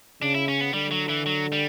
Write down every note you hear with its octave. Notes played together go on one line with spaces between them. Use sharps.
C#3 D4
E4
C#4
B3
D3 G3
F#3
E3
F#3
G3